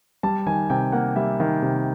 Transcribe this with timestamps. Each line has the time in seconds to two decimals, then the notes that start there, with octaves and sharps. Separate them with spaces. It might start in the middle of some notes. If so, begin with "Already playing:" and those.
0.23 G3 A5
0.46 D#3 G#5
0.70 C3 G5
0.92 A#3 F#5
1.16 G3 E5
1.40 D#3
1.62 C3